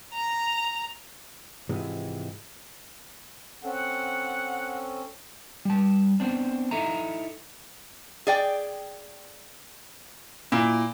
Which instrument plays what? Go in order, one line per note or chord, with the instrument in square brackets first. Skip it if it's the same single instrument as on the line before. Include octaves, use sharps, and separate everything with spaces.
[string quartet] A#5
[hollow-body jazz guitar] G#2 C3 E3 F3 G#3
[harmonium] C4 C#4 A4 [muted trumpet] F#5
[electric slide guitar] G3 A5
B3 C4 D4
D#4 E4 A4 E5 A#5
[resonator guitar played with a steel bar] G#4 D5 G5
[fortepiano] A#2 [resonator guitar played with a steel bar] E4